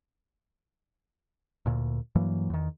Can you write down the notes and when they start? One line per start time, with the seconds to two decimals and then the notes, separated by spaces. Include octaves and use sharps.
1.66 D2 A#2
2.15 G2 E3 F#3 A#3
2.50 E2 D#3